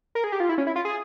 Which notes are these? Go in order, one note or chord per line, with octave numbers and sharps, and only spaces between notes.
A#4
G#4
G4
F4
E4
C#4
E4
F4
G#4